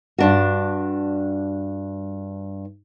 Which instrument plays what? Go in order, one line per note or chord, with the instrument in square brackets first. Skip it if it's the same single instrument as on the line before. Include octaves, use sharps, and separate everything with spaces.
[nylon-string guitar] G2 D4 F#4